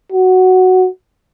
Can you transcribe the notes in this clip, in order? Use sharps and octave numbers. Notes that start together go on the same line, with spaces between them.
F#4